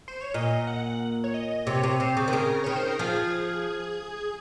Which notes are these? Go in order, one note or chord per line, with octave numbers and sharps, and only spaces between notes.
C5
C#5
A#2 D#5
F#5
C#5
D#5
C3 C#5
C3
C3 C5
C#3
D#3
C#3 A#4
D#3 C#5
C5
A#4
F3 G#4